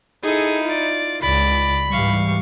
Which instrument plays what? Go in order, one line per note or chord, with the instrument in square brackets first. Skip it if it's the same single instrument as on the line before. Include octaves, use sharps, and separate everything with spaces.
[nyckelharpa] D#4 E4 [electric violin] G#4 A4
[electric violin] F4 D5
[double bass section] C#2 [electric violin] D5 [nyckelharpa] B5
[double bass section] G#2 E3 G3 [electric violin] F5 C#6